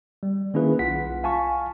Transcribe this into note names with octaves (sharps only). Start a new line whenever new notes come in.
G3
D#3 A#3 C#4 E4 G#4 B4
B1 F4 F#5 B6
F5 G#5 A5 C#6